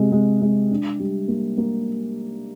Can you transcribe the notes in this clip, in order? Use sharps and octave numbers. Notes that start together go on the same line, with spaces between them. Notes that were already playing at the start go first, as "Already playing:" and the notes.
Already playing: C3 G#3
G#3
G#3
D4
G3
A#3
A#3